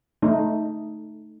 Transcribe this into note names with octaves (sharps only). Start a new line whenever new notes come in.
A3 D#4